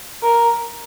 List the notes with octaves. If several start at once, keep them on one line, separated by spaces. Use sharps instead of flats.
A#4